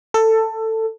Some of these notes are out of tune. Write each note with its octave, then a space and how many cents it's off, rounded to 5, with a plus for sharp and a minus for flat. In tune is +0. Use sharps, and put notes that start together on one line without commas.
A4 +15